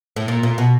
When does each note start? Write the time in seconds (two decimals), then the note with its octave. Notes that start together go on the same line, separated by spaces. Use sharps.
0.16 A2
0.28 A#2
0.43 A#2
0.58 B2